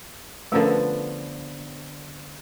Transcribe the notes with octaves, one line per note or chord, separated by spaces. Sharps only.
D3 F3 A3 B3 C#4 A#4